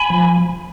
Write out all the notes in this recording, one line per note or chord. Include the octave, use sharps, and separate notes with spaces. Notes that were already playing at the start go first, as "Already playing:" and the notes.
Already playing: G#5 B5
F3